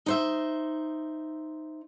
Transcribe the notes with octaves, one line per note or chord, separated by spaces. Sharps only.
D#4 C5 E5